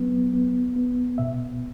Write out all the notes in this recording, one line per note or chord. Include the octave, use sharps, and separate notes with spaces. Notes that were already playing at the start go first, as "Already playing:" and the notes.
Already playing: F#3 B3
B3
B3
B2 E5